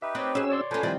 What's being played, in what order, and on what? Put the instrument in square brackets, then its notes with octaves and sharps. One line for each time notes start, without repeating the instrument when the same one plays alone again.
[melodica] D#4 G4 B4 [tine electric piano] E5
[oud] C4 [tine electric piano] C#5 D6 F#6
[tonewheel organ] C#4 E6 [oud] F#4 G#4
[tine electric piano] C#5 D5 C6
[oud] F3 C#4 [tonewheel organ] A4 [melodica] B4 C5 G#5
[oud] D#3 C4 D5 [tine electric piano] F3 G3 E4